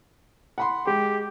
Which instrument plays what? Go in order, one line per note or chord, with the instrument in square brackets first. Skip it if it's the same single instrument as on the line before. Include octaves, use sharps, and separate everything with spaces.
[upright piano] F#5 B5 C6
[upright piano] G#3 [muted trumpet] G4